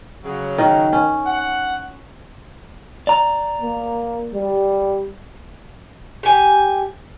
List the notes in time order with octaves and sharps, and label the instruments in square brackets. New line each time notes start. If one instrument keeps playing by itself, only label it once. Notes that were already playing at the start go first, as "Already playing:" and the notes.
[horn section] C#3 F#3
[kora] D#3
C#4
[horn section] F#5
[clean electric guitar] D5 A#5
[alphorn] A#3
G3
[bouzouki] G4 G#5